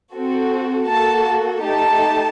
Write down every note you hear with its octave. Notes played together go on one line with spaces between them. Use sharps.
C4 F#4 A4
A#3 F#4 A4 A5
A3 D#4 G4 A5